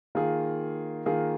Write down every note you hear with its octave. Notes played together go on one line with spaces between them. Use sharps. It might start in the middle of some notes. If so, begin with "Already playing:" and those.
D#3 A#3 F4 G#4
D#3 A#3 F4 G#4